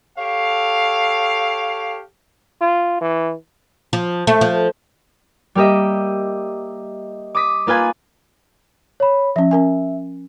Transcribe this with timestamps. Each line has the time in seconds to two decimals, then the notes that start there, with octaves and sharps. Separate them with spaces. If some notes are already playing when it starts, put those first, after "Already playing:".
0.17 G4 A4 C#5 F5
2.61 F4
3.01 E3
3.93 F3
4.27 A3
4.41 F3
5.55 G3 A#3 G4 D#5 E5
7.35 D6 D#6 B6
7.67 A#3 F4 B4 G#5 G#6
9.00 C#5 B5
9.36 F3 C#4 E5
9.51 C#4 A#4 G#5